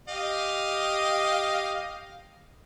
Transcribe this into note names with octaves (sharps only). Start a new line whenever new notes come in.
G4 D#5 F5